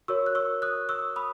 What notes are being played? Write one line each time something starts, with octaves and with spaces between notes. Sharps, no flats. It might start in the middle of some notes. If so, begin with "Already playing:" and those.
F#4 A#4 C#5 C#6 E6
F#6
C#6 E6
D#6 F#6
C#6 E6
B5 D#6